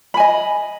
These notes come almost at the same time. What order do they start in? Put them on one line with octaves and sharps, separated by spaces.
B5 G#5 D#5